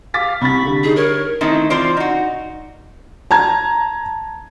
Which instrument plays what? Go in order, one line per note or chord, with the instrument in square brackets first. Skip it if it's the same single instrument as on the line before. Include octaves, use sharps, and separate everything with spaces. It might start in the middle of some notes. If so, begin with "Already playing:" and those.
[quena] F5 [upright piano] D6 A6 B6
[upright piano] C2 C3 A6 [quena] B5 [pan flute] C#6
[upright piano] D3 G3
[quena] D#4 [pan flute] G#4
[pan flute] A#4 [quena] C#5
[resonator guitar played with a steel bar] D#3 A3 C4 D#4 E4 A4
E3 C4 F4 C5 D5
D#4 F#4
[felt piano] A5 A#5 G#6